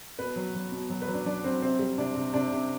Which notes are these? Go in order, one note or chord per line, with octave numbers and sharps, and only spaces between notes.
B2 B4
F#3
F#3
B2
F#3
B4
F#3
D4
F#3 D4
F#3 C4
C3 C4
G3
C3 D4
C3
C3 D4
C3